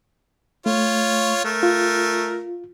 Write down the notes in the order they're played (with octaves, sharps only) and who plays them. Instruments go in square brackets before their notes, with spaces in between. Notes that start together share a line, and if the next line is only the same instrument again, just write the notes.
[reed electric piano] A3 [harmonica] F4 C#5
[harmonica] A3 A#4
[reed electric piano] F4